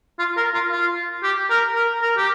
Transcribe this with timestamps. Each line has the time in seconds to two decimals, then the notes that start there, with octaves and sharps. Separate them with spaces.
0.19 F4
0.37 A#4
0.54 F4
0.71 F4
1.23 G4
1.50 A#4
1.75 A#4
2.02 A#4
2.17 G4